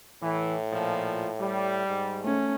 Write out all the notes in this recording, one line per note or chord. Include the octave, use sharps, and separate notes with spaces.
A2 E3
A#2 F3
G3
G#2
A3 C#4